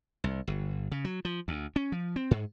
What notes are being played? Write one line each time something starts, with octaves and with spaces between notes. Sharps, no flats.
C2
G1
C#3
F#3
F3
D2
C#4
F3
C4
G#2